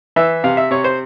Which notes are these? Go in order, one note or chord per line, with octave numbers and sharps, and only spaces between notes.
E3 E5
C3 F5
E5
C3 C#5
C5